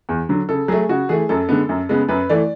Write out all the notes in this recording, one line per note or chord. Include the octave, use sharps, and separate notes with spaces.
E2
D3 F#3
C#3 A4
F#3 A3 G#4
C#3 F#4
E3 A3 G#4
F#2 A4
D3 G#3 B3
F#2
C#3 G#3 B3
F#2 B4
E3 A3 D5